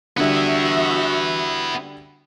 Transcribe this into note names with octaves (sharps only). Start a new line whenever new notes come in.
D3 G3 B3 E4 F#4 E5